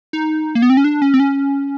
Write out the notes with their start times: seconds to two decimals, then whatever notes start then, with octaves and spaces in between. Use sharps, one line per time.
0.13 D#4
0.55 A#3
0.62 B3
0.70 C4
0.77 C#4
0.84 D4
1.02 C#4
1.14 C4
1.20 C#4